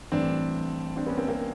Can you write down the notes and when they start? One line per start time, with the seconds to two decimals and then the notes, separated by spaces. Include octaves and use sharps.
0.12 A1 A2 E3 G3 C4 D4
0.96 C4 D4
1.07 B3 C#4
1.17 A#3 C4
1.28 A#3 C4